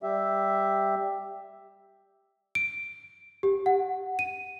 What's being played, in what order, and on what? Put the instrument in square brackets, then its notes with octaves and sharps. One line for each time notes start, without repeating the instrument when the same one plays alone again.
[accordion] G3 G4 E5
[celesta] D7
G4
F#5
D#7